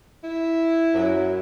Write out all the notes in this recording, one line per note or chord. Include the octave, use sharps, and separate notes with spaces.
E4
F#2 F#3